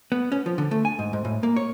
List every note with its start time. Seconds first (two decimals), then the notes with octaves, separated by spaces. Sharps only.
0.12 B3
0.32 C#4
0.46 F3
0.58 D3
0.71 A3
0.85 G#5
0.99 G#2
1.13 G#2
1.25 A2
1.43 A#3
1.56 C#5